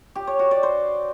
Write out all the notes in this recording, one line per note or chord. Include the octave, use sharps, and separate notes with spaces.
G4
C#5
F#4
D5
C5